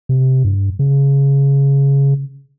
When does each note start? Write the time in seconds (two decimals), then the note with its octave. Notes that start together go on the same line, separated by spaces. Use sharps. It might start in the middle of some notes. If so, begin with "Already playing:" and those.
0.09 C3
0.44 G2
0.79 C#3